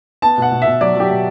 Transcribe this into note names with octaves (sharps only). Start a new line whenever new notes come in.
B3 A5
B2 F#5
B2
B2 E5
F#3 D5
F#3 G4
B2